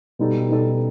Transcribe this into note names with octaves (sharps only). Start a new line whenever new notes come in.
B2 G3 D#4 A4
B2 G3 D#4 A4